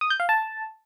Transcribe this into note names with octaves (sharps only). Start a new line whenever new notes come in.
D#6
G6
F5
A5